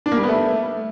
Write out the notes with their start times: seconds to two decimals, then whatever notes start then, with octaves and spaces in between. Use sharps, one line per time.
0.06 D4
0.12 A#3
0.17 G3
0.23 B3
0.29 A3